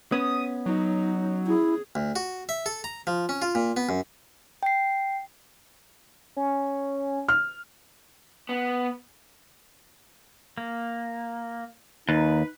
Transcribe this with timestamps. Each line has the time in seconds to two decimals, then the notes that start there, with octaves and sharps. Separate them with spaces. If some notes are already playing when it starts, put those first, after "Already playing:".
0.12 B3 C#4 D#6
0.66 F#3 D#4
1.47 E4 G#4
1.95 D2
2.16 F#4
2.49 E5
2.66 A4
2.84 A#5
3.07 F3
3.29 C#4
3.42 F4
3.55 A#2
3.77 B3
3.89 F#2
4.63 G5 C7
6.37 C#4
7.28 F6
8.49 B3
10.58 A#3
12.09 D#2 D#4 B4